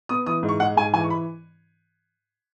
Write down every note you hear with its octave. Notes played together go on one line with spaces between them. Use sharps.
B3 D#6
E3 D#6
G#2
C#6
G#3 F#5
G#2 G#5
E3 G#5
C#6
B5